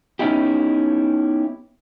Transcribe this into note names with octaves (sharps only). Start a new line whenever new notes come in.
B3 C#4 D#4 E4 G4